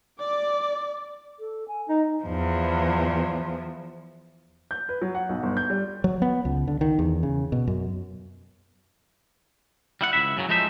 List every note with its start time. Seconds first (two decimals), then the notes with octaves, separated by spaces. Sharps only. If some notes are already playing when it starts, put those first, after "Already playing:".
0.20 D5 D6
1.39 A4
1.68 G#5
1.89 D#4 D#5
2.24 E2 F3
4.71 G6
4.89 B4
5.01 F#3
5.15 F#5
5.29 B1
5.43 G1
5.57 G6
5.70 G3
6.04 F#3
6.22 B3
6.45 C#2
6.68 D3
6.81 D#3
6.99 E2
7.23 C#3
7.52 B2
7.68 F#2
10.01 G3 E4 F#5
10.13 C#2 D#3 E4 E5
10.37 F#2 C#3 F#3
10.49 F3 G#3 A3 D#4 C5 E5